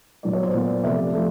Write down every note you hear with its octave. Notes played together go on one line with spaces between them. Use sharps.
A#2 F#3 B3 D5
C#5
C5 D5
A#2 F#3 B3
C3 F3 A3 D5 E5
F3 A3